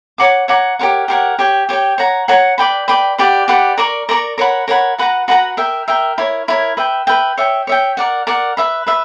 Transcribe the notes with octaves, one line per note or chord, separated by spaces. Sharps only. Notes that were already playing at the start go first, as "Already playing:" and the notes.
C#5 F#5 A#5 D6
C#5 F#5 A#5 D6
G4 A#4 C#5 F#5
G4 A#4 C#5 F#5
G4 C#5 G5
G4 C#5 G5
C#5 F#5 A#5
C#5 F#5 A#5
B4 D5 G5 B5
B4 D5 G5 B5
G4 B4 D5 F#5
G4 B4 D5 F#5
A#4 D5 A#5 C#6
A#4 D5 A#5 C#6
A#4 C#5 F#5 B5
A#4 C#5 F#5 B5
F#4 B4 F#5 A#5
F#4 B4 F#5 A#5
A#4 E5 G5
A#4 E5 G5
E4 A#4 C#5
E4 A#4 C#5
B4 E5 G5
B4 E5 G5
C#5 E5 G5
C#5 E5 G5
A#4 D5 F#5
A#4 D5 F#5
B4 E5 B5
B4 E5 B5